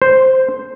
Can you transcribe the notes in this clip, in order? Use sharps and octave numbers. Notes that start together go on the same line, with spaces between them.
C5